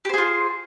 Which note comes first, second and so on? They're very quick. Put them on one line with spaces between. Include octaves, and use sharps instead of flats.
G4 C5 G#4 F4